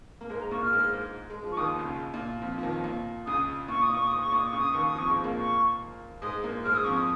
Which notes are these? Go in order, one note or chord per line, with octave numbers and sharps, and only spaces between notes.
A#3
G#2 G#3 A#4
A#5
A#2 A#3 C#6
A#3 F6
G#2 G#3
G#2 G#3
G#3
F3
C#6
D#2 D#3 D#6
C#2 C#3
A#2
F2 F3
F3
D#2 D#3
A#2
C#2 C#3 D#6
A#2 C#6
D#6
A#2
C#6
G#2 D#6
C#6
A#2 D#6
C#6
C#2 C#3
D#6
D#2 D#3 C#6
D#6
F2 F3 C#6
G#2 G#3
A#2 A#3
C#6
G#2 G#3 D#6
A#2 A#3
G#2 G#3 F6
D#6
F2 F3 C#6
D#6